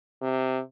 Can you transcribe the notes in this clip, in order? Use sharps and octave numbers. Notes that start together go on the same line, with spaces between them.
C3